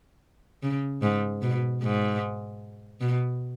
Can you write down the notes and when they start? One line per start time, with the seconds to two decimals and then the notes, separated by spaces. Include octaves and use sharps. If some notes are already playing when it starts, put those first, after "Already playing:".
0.63 C#3
1.02 G#2
1.42 B2
1.82 G#2
3.01 B2